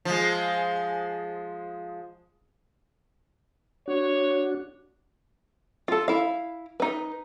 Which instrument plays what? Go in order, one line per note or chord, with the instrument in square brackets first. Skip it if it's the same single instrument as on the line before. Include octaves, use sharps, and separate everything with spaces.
[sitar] F3 G#3
[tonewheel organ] D4 F#4 [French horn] C#5
[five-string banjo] F4 A4
E4 F5
D#4 B4